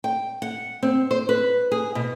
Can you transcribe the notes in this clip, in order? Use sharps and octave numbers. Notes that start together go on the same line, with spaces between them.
G5
F#5
C4
C5
B4
G#4
B2